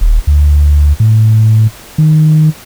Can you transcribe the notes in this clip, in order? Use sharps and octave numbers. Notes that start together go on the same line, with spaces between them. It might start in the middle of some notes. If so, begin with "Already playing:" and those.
D#1
D2
A2
D#3